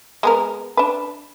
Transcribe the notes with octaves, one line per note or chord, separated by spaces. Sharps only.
G#3 B3 A#4
D4 B4